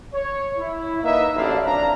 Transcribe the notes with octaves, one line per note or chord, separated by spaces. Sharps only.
C#5
E4
A#3 D#4 B4 D#5 E5
A1 F#2 A2 D4 E4 F5
F2 D4 F5 A#5